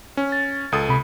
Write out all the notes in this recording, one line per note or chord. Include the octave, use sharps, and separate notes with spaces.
C#4
A6
C#2 A4 D#6
C3 B5